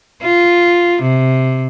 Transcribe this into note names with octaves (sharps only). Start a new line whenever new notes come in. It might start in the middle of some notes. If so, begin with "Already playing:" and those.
F4
C3